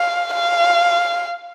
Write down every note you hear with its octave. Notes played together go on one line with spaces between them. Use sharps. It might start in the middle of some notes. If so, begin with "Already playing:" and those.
Already playing: F5
F5